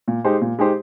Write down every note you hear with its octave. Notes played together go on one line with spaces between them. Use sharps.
A#2
G#3 D#4 G4 C5
A#2
G#3 D#4 G4 C5